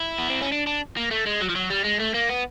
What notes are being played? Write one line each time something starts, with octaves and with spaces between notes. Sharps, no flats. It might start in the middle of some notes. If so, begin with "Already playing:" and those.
Already playing: E4
B3
C4
C#4
D4
D4
A#3
A3
G#3
F#3
F3
F#3
G3
G#3
A3
A#3
B3